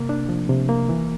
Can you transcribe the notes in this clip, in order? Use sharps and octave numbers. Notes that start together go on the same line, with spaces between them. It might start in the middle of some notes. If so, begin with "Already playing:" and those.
Already playing: C3 A#3
D4
F3
C3
A#3
E3